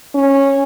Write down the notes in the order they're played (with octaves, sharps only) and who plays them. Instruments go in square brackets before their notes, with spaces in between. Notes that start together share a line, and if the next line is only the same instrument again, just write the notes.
[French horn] C#4